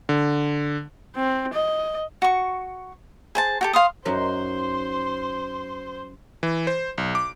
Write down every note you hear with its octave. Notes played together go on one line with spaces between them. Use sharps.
D3
C4
D#5
F#4 C#6
G#4 C5 A5
F#4 G4 A4
F5 C6 D#6
F#2 F#3 D#4 C5 C6
E3
C5
B1
D6